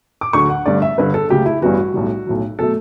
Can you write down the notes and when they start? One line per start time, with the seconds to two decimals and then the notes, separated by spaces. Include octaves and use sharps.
0.21 D6
0.33 D2 D3 F#3 C#6
0.50 F#5
0.66 G1 G2 D3 A3 D5
0.82 E5
0.98 G1 G2 D3 B4
1.14 A4
1.30 C#2 C#3 F#3 A3 G4
1.46 E4
1.62 A1 G2 E3 G3 B3 F#4
1.94 B1 A2 G3
2.27 B1 A2 F#3
2.59 B2 F#3 A3 A4